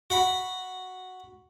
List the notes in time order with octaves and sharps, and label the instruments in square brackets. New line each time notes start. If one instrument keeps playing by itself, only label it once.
[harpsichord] F#4 F#5 B5